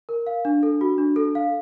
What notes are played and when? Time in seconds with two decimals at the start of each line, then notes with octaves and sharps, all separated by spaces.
0.09 A#4
0.27 F5
0.45 D4
0.63 A4
0.81 F#4
0.98 D4
1.16 A4
1.35 F5